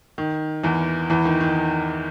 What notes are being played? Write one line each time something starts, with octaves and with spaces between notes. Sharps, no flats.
D#3
E2 E3
E2 E3
D#3
D#3